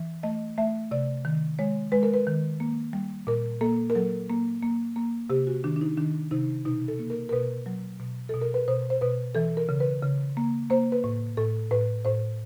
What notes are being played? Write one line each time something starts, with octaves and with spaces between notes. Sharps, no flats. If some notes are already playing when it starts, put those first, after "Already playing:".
Already playing: E3
A3 D#5
A3 E5
C3 D5
D#3
G#3 C#5
G#3 B4
A#4
B4
D#3
A#3
G3
A#2 A#4
A#3 A4
A#4
F#3 A4
A#3
A#3
A#3
C3 G4
F#4
D#3 D4
D4
D#4
D#3 D4
C3 D#4
B2 D#4
A4
A#3
A#4
A#4
B2 B4
F#3
B2
B2 A4
A#4
B4
B2 C5
C5
B2 B4
E3 A4
A#4
C#3
B4
C#3
A#3
A#3 C5
B4
A2
A2 A4
A2 B4
A2 C5